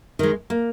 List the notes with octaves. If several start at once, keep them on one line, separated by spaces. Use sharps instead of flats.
D#3 G#3
A#3